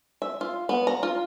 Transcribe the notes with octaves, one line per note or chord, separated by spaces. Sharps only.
E5
F4
B3
A#5
F4